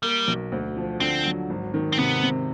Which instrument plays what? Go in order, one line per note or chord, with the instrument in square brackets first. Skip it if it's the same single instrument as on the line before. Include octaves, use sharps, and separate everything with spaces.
[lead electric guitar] G3 [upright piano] A#3
[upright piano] B1
D2
F3
[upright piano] D3 [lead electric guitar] C4
[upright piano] F#3
G#1
D#3
[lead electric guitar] C4
[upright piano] C3 [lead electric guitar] B3
[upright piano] C3